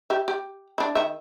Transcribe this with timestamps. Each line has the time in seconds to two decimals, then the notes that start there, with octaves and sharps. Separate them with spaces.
0.10 G4 E5
0.28 G4
0.78 D4 E4
0.95 D#3 E5